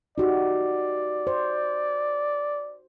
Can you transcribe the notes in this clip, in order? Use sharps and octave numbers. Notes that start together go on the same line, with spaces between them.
D#4 F#4 G4 D5
C5